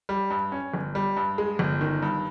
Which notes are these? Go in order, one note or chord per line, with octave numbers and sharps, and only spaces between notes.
G3
G2
C#4
G1
G3
G2
G#3
G1
D#3
G2